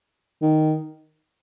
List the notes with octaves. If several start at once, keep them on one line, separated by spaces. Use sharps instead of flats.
D#3